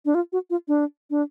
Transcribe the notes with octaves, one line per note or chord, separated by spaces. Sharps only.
D4
F4
F#4
F4
D4
D4